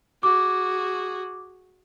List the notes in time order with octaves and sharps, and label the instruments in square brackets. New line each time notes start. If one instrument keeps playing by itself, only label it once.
[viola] F#4 G#4 [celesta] D6